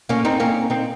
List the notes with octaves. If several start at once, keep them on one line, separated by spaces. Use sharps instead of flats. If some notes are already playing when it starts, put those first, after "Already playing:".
A#3 C#4
C4 D#4
A#3 C#4
C4 D#4